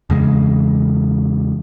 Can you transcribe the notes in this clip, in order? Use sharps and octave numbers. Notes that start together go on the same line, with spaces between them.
E2 C#3 G#3